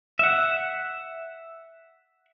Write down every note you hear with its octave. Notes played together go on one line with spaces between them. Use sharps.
E5 F#5